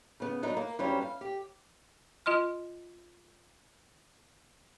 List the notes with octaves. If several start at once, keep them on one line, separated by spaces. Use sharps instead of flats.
C#3 B3
F#3 B3 D4 D#4
A#3
G2 F#3 G3 C4 C#4
F5
G4
F4 D#5 C6 F6